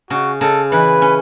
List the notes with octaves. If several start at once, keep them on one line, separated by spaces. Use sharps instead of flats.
C#3 F#4
C#3 A4
E3 B4
C#4